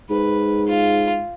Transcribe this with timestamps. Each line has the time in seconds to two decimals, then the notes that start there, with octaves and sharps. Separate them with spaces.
0.10 G#2 B4
0.67 F4